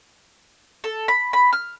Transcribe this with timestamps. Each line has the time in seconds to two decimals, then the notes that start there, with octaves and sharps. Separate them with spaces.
0.84 A4
1.08 B5
1.33 B5
1.53 F6